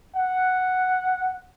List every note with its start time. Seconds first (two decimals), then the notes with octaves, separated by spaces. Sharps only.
0.16 F#5